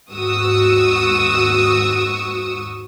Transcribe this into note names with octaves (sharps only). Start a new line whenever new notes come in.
D#2 G#2 F#4 C#6 D#6 E6